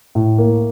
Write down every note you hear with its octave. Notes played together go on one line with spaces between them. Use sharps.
A2
A#3